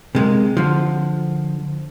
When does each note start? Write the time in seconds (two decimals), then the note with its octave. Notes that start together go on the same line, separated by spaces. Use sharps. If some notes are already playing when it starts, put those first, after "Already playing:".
0.15 C3 G#3 A#3
0.57 D3 F3